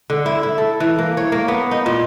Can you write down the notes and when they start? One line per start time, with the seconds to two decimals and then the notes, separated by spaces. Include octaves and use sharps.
0.10 D3
0.26 E4
0.43 E4
0.58 A4
0.80 E3
0.98 A#3
1.17 C#5
1.32 A#3
1.48 B3
1.71 D#4
1.86 A#2